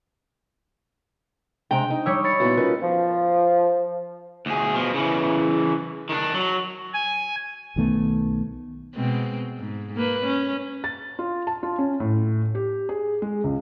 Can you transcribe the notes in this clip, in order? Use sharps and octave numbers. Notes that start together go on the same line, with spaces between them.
C3 G#3 D4 G5 A#5
D#4
G3 C#5 C#6 D#6 E6
B5 A6 C#7
A#2 B3 D#4 E4 F#4
C#4 F4 A#4 B4 D#5
F3
D2 G#4
B2 F3
C#3 E3
D#3 D4
F#3
G#5
B1 D#3 A3 B3
B2 G#3 C4
G#2
A#3 B4
C#4
A6
F4
A5
F4
C#4
A2
G4
G#4
G#3
C#2